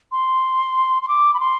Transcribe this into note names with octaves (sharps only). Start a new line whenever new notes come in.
C6
C6
D6
B5
C6